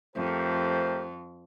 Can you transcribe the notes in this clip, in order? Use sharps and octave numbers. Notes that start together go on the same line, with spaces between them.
F2 A3 G4 A#4 C5